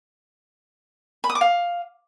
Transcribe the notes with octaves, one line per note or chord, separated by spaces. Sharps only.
B5
D#6
D6
F5